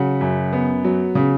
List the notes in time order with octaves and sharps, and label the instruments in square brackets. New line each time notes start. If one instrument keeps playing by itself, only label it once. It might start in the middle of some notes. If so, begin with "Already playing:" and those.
Already playing: [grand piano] C#3 F#3 F#5
F#2
B3
F#3
C#3